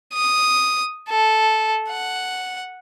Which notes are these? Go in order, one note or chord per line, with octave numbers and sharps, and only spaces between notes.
D#6
A4
F#5